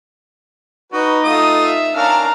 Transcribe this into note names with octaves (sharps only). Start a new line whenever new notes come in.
D#4 F#4 B4 D#5
A3 F4 D#6
E5
C#4 D4 A#4 F5 A#5